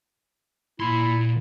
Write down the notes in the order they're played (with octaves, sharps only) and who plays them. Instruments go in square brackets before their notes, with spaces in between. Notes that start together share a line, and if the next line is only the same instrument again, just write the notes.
[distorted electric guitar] A#2 C6 [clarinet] E4